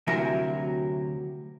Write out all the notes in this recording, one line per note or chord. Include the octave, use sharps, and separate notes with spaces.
D2 C3 F#3 E4 A#4 G#5